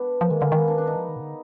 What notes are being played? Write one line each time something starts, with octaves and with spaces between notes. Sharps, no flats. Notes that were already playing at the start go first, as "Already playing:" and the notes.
Already playing: B3 D4
F3 A#3
D#3 G#3
D3 A#3
D#3
B3
D4
D4
D#4
F3
D#3
B2
D3